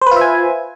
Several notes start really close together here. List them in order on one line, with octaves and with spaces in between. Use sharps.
C5 B4 F4 E5 G#5